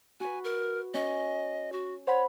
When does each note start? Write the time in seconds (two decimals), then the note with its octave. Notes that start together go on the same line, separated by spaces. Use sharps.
0.20 F#4 B4 G#5
0.44 A#4
0.94 C#4 D#5
1.72 F#4
2.07 C5 C#5 F#5 B5